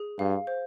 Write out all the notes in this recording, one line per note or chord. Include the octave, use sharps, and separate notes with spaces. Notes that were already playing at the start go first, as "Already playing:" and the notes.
Already playing: G#4
G2 F5
C5